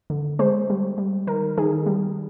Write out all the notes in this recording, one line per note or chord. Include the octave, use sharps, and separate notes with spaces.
D3
G#3 C5
G3
G3
D#3 A#4
D#3 G#4
G3